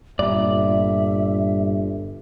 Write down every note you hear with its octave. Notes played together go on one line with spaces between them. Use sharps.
G1 G2 A#2 D5 E5